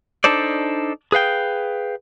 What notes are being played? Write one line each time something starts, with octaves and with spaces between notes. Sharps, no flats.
D4 D#4 A4 C5 D5
G#4 B4 F5 G5